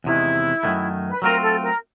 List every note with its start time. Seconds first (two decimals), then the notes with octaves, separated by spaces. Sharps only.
0.04 E2 C3 D#3 G#3 E4
0.63 F#2 D#3 F#3 A3
1.10 B4
1.22 F#3 A3 C4 F4 A#4
1.42 A4
1.61 A#4